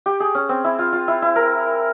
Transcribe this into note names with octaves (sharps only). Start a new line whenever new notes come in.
G4
G#4
C#4
C4
E4
F4
F4
E4
E4
A#4